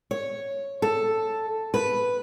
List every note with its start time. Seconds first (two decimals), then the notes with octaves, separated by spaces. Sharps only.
0.11 C#5
0.82 A4
1.74 B4